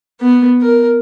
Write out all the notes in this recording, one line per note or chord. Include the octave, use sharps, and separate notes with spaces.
B3
A#4